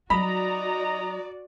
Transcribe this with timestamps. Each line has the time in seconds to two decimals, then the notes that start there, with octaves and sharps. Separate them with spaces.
0.10 F#3 D#4 F#4 D5 D#5 A#5 B5